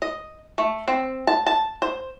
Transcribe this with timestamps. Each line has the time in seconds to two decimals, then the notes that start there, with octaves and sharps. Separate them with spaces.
0.02 D#5
0.58 A3
0.88 C4
1.27 A5
1.46 A5
1.82 C5